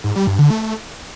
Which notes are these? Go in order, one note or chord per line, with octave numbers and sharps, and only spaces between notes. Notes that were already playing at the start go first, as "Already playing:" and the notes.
G#2
G3
G2
D3
A3